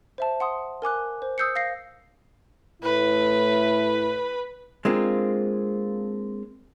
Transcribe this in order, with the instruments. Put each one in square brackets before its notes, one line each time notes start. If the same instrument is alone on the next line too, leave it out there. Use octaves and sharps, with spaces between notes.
[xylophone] C5 E5 A5
F#5 C6 D#6
A#4 G#5 D6 F#6
C5
D#6 E6 G6 C7 C#7
F5 A#6 C7
[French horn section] A2 E4 [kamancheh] B4
[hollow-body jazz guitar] G#3 A#3 C4 D4 F4